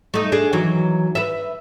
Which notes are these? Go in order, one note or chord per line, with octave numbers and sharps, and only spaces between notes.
A3 D#4
D4 G#4
D#3 E3 F#3
B4 E5